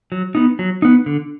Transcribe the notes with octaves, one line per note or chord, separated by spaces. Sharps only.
F#3
B3 D#4
F#3
B3 D#4
D3